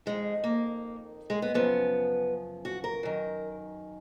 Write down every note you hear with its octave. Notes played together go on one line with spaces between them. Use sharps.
F2 D#3 G#3
A#3
G#3
B3
F#2 C#3 F3 B3
F#4
A#4
F#2 D#3